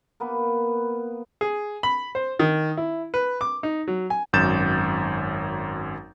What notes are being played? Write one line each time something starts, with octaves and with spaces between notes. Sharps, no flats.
A#3 B3 B4
G#4
B5
C5
D#3
E4
B4
D6
D#4
F#3
G#5
G#1 F#2 G6 A6 E7